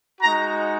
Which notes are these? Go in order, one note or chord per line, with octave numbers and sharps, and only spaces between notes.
G#3 D#4 F#4 A#5